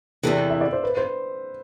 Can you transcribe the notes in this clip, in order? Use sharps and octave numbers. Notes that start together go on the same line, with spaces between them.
E2 C3 E3 A4
E5
D5
C5
B4
C5